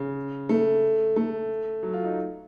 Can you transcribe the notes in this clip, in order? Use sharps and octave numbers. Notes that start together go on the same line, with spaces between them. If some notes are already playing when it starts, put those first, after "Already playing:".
Already playing: C#3
A3
A3
F#3
F4
D#4